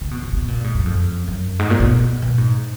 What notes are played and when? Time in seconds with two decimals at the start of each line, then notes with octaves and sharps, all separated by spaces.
0.01 C#3
0.11 B2
0.23 B2
0.33 B2
0.48 A#2
0.64 G#2
0.75 F#2
0.86 F2
1.28 F#2
1.59 G#2
1.70 A#2
1.80 B2
2.22 B2
2.38 G#2